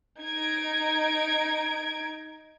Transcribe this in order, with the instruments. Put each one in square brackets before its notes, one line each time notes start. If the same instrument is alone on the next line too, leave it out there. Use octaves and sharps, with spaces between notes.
[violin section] D#4 G#6 D7